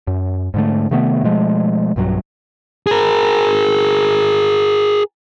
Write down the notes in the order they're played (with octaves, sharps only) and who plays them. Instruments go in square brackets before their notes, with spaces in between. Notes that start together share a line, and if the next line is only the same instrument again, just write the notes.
[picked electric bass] F#2
G#2 D3 A3
C3 D#3 A3 B3
B2 F3 G#3 A3
B1 G2 F#3
[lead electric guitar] G#4 A#4